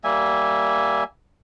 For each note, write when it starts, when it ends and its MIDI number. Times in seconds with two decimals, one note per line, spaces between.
0.04 1.04 55
0.04 1.04 58
0.04 1.04 76
0.04 1.04 80